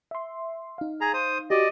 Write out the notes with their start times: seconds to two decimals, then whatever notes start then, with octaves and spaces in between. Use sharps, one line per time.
0.11 E5 C6
0.78 D#4 F5
1.01 G#4 A#5
1.14 C5 D#6
1.50 F#4 G4 D5 D#5